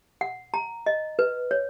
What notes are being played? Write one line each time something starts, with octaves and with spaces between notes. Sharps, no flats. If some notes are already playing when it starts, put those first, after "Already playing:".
F#5
A#5
D#5
B4
C#5